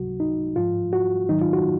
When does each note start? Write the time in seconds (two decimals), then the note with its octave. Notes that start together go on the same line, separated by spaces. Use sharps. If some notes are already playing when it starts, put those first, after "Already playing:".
Already playing: C#2 C3 F#3 F#4
0.20 D#4
0.56 G#2 F3 F4
0.93 F#4
1.29 G#2 D#3 F#3 D#4
1.41 F4
1.53 F#4